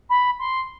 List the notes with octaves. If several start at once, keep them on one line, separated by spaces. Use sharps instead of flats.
B5
C6